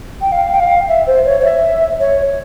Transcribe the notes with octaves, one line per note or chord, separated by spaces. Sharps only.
G5
F5
G5
F5
E5
C5
C#5
C#5
E5
C#5